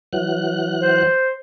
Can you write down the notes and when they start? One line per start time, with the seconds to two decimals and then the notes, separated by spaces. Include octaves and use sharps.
0.13 E3 F#3 F#6
0.80 C5